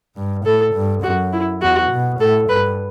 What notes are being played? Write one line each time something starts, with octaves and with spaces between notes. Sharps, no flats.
G2
A2 A4
G2
F#2 F#4
E4
E2 F#4
B2
A2 A4
G2 B4